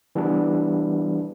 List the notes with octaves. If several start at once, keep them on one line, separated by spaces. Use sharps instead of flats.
E3 G3 B3 D4